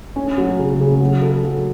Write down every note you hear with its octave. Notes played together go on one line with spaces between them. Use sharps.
C#4
F#3
C#3
C#3
F#3
A4
F#3